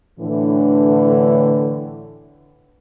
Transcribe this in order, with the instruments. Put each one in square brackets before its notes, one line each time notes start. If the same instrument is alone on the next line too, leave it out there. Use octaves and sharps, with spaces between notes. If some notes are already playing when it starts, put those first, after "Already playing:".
[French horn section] A2 D3 E3